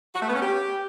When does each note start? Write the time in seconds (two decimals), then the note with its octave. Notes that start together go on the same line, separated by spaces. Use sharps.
0.15 F#4
0.22 A3
0.28 B3
0.35 C#4
0.41 G4